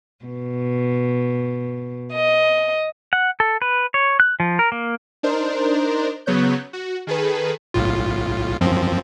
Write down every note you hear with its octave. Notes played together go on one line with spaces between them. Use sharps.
B2
D#5
F#5
A4
B4
C#5
F#6
F3
A#4
A#3
D4 D#4 A#4 C5
C#3 F#3 B3 C#5 F#6 G6
F#4
D#3 G#4 A4 B4
B1 A2 F4
F#2 F3 C4